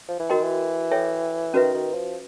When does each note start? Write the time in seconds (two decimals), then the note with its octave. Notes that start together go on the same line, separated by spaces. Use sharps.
0.08 F3
0.19 E3
0.29 D#3 F#4 A#4 D#5 G5 C6
0.43 E3
0.91 A4 C#5 E5 G5
1.54 D#3 C#4 F#4 B4 E5
1.75 D#3
1.95 F3